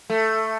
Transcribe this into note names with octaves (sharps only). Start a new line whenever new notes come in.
A3